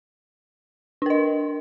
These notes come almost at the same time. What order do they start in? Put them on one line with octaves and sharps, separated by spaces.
D4 A#4 D#5